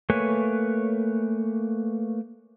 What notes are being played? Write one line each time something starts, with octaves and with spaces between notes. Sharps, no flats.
A3 A#3 B4 C#5 G#5